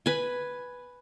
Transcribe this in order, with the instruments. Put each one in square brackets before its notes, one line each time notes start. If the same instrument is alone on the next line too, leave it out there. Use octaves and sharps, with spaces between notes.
[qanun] B4 G#5